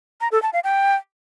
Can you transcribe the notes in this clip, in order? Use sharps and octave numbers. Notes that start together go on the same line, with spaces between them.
A#5
A4
A5
F5
G5